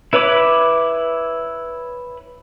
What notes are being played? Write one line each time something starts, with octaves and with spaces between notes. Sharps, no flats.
E4 B4 C#5 B5 D6